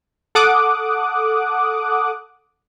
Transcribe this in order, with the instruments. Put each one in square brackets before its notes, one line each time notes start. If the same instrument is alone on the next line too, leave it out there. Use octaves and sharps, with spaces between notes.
[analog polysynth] A4 F#5 D6 D#6 F#6